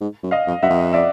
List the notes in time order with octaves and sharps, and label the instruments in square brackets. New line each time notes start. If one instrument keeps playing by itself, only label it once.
[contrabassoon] G#2
F#2
[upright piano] D#5 F5
[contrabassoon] F2
[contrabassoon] F#2 [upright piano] E5 F#5
[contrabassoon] F2
[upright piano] D5 E5